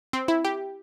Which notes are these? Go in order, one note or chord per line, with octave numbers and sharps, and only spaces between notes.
C4
E4
G4